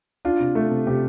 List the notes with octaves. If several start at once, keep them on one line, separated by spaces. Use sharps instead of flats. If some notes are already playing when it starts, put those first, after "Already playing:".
D4 F4
C3
A3
C3
C3 G4